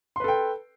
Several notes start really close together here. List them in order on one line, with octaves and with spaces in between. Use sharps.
C6 B4 A4 G5